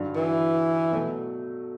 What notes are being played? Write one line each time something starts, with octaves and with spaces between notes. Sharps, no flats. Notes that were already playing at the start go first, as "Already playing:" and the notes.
Already playing: G2 D3 F#3
E3
B2 F#3 A3